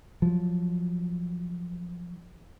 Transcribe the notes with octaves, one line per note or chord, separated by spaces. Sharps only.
F3 F#3